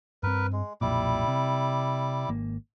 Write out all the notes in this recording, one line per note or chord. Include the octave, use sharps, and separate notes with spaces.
G2 C4 A#4 B4
G#3
B1 F2 A#2 G3 E4 D6
C3
G#1 A#3